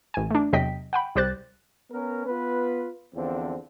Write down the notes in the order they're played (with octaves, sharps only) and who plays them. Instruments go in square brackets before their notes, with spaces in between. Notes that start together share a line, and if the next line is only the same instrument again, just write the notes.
[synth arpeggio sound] A1 G#5
A3 D4
E2 C3 F#3 D#5 G5 B6
F#5 G5 B5
C2 G3 G4 C5 F#6 A6
[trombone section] B3 C#4 A#4
B3 F4 B4
E2 D3 F3 C4